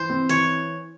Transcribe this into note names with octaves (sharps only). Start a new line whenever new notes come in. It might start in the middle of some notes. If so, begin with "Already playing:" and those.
Already playing: E3 C5
C4
E3 C#5